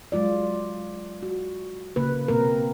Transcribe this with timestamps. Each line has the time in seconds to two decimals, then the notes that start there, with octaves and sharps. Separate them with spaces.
0.12 F#3 G#3 F4 D5
1.23 F#4
1.96 C#3 A#3 B4
2.28 B2 A#3 C4 A#4